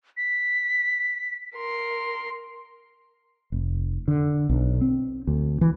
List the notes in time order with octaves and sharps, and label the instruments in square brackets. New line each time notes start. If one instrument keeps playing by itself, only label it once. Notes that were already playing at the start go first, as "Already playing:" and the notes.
[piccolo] B6
[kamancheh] A#4 C6
[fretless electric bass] F1
D3
B1
C4
D2
E3